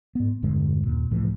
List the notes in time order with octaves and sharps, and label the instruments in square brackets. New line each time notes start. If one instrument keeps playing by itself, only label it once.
[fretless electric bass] G#2 B3
E1 G2 D3 G#3
D#2 A#2
C2 A2 E3 F3